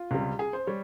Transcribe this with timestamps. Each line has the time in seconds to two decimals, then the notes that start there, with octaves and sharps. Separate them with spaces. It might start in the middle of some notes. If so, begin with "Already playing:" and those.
Already playing: F4
0.11 C#2 C3 G3
0.39 G#4
0.53 C5
0.67 G3 C#5